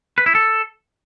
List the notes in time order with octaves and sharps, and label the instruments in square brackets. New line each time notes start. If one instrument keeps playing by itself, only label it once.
[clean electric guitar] B4
E4
A4